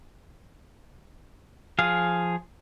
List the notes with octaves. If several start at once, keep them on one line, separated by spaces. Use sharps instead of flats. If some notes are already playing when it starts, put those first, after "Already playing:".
F3 G#4 F5